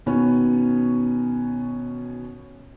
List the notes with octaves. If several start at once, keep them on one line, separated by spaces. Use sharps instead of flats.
B2 D#3 B3 C#4